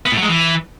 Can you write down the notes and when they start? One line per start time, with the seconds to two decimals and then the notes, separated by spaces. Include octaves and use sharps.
0.06 B3
0.11 A2
0.17 F#3
0.23 G#3
0.28 E3